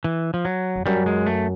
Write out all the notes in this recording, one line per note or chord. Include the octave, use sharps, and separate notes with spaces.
E3
F3
F#3
F2
F#2 G3
G#3
A3